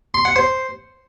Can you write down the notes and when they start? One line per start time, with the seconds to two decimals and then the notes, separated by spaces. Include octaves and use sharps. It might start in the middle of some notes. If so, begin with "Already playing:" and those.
0.14 C6
0.25 F#5
0.36 C5